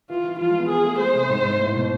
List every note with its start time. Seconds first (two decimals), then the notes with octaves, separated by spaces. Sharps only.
0.10 E3 F4
0.24 E3
0.39 F3 F4
0.49 G#3
0.59 B3
0.69 B3 G#4
0.85 A3
0.99 G#3 C5
1.14 C3
1.29 G#2
1.44 G#2
1.59 A2
1.75 B2